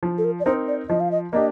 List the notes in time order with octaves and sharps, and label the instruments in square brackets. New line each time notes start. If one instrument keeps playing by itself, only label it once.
[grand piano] F3
[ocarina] A4
A#4
D5
[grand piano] C4 D#4 A#4 [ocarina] C5
[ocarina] D5
[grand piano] F3 [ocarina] D#5
[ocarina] F5
D#5
[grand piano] A#3 D4 G4 [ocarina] D#5